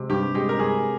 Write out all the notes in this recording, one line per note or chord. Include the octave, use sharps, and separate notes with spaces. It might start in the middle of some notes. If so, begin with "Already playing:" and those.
Already playing: C3 G#3
G2 G4
G#3 G4
A#4
G2 G#4